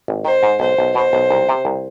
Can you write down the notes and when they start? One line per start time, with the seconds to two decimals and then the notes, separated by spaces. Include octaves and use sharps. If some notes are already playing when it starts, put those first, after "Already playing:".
0.08 G#1
0.25 D#3 C5
0.43 G#2
0.60 B1 C5
0.78 B1
0.95 B2 C5
1.13 B1
1.31 C2
1.49 C3
1.65 C2